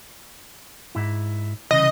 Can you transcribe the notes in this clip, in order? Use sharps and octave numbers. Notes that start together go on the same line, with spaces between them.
G#2 E4
C2 C#3 E3 D#5